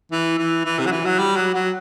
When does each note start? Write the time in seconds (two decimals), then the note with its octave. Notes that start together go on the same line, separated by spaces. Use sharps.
0.12 E3
0.39 E3
0.65 E3
0.79 C3
0.86 F#3
0.92 E3
1.05 F#3
1.19 G3
1.36 F#3
1.54 F#3